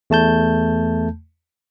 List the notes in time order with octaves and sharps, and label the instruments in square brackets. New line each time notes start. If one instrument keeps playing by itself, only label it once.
[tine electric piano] E2 A3 A5 G6